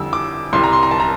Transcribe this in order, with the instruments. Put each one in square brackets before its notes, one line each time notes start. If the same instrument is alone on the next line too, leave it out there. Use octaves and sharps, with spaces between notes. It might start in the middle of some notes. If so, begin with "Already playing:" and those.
Already playing: [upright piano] F2 D3 G3 E6
D6
C2 C3 G3 C6
A#5
C6
A#5
A5
A#5